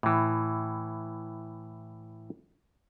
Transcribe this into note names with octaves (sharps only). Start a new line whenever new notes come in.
A2 E3